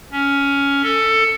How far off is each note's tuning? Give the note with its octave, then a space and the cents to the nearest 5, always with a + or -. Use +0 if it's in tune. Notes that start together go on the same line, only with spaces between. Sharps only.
C#4 +15
A4 +15